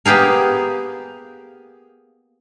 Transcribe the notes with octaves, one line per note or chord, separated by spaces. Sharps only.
A#3 B3 G4 G#4 A#4